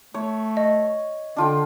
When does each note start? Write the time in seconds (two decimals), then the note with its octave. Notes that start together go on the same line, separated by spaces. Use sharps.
0.14 A3 C#5
0.57 D#5
1.36 D3 D4 F4 G5